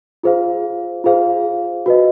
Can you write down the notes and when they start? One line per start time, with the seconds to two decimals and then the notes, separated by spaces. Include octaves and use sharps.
0.23 F4 G#4 C5 F5
1.04 F4 G#4 C5 F5
1.86 F#4 B4 D#5